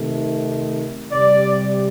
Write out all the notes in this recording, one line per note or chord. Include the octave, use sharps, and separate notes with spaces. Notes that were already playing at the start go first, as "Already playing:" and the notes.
Already playing: C3 D#3 A3
C3 G3 D5